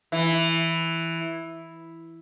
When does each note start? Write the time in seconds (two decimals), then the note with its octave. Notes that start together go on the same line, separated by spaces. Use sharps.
0.12 E3